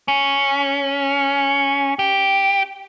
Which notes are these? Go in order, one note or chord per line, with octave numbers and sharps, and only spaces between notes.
C#4
G4